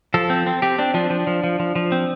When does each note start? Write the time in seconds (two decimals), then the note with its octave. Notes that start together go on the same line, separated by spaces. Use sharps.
0.14 F3 A4
0.30 C4
0.47 C4
0.62 C4 G4
0.79 C4 D4
0.94 F3 D4
1.10 F3
1.27 F3
1.44 F3
1.59 F3
1.76 F3
1.92 C4